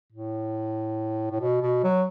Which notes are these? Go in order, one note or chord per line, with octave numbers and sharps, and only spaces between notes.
A2
A2
B2
B2
F#3